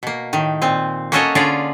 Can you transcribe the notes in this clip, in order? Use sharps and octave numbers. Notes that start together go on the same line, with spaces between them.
B2 A#3
A2 D#3
A#2 C4
A#3 C#4 F#4 A4 C#5 D#5
D3 C#4 F4 G#4 D5